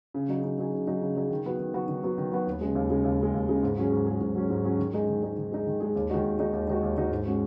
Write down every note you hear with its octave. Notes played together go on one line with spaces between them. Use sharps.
C#3
F#3 D#4 G#4
C#3
F#3 D#4 G#4
C#3
F#3 D#4 G#4
C#3
F#3 D#4 G#4
D#3
F#3 B3 F#4
D#3
F#3 B3 F#4
D#3
F#3 B3 F#4
D#3
F#3 B3 F#4
D#2
C#3 G#3
D#2
C#3 G#3
D#2
C#3 G#3
D#2
C#3 G#3
G#2
F#3 C#4 G#4
G#2
F#3 C#4 G#4
G#2
F#3 C#4 G#4
G#2
F#3 C#4 G#4
D#3
G#3 D#4 G#4
D#3
G#3 D#4 G#4
D#3
G#3 D#4 G#4
D#3
G#3 D#4 G#4
D#2
D#3 G#3 D#4 F#4
D#2
D#3 G#3 D#4 F#4
D#2
D#3 G#3 D#4 F#4
D#2
D#3 G#3 D#4 F#4
G#2
G#3 C#4 F#4